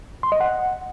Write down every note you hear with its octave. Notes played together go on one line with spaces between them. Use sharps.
C6
D#5
F#5